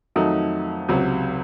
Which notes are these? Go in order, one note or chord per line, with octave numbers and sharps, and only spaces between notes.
F2 D#3 F#3 A3 D#4
C#2 C3 F#3